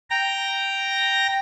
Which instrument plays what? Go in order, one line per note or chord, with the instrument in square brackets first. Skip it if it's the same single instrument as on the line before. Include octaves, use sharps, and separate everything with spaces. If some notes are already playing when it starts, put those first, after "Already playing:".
[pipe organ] G5 A#5 A#6